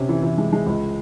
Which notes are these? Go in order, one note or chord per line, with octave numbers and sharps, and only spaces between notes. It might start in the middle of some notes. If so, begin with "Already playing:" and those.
Already playing: C3 C#4
E3
E3
G#3
G#3
C#2